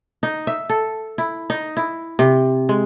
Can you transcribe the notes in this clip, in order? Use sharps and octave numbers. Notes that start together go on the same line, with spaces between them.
D#4
E5
A4
E4
D#4
E4
C3
G#3